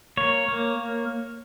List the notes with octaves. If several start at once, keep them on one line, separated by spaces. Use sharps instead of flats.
A#3 C#5
A#3